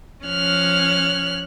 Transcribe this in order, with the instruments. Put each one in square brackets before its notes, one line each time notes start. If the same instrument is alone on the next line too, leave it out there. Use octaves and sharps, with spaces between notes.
[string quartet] F3 C#4 F6 F#6